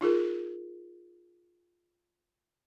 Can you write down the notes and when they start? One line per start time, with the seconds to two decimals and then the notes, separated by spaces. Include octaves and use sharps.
0.01 D#4 F4 G#4 A#4